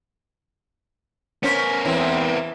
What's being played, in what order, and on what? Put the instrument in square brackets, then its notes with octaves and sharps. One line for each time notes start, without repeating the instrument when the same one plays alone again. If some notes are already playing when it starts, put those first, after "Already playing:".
[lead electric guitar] B3 A#4 [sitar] C#4 C5
[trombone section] E2 C4 [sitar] E3